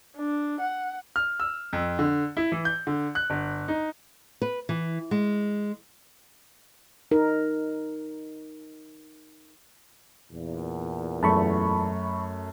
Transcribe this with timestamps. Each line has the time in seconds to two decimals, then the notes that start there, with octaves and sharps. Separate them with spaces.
0.16 D4
0.60 F#5
1.16 F6
1.40 E6
1.73 F2
1.99 D3
2.37 E4
2.52 E3
2.65 G6
2.87 D3
3.15 F#6
3.30 G1
3.68 D#4
4.42 B4
4.69 E3
5.11 G#3
7.11 D#4 A#4
10.32 E2 A#2
11.23 F#2 A3 A5 B5 C#6